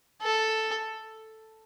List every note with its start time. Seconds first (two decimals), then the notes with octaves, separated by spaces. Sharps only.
0.23 A4